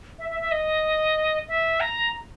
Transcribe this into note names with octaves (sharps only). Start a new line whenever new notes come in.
E5
E5
E5
D#5
E5
A#5